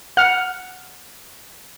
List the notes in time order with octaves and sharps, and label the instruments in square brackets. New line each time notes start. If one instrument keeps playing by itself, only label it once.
[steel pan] F#5 [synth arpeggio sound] F6